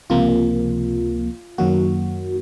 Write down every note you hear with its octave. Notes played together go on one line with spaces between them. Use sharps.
C#2 C3 F3 A#3 F4
F#2 D#3 F#3 A#3 F#4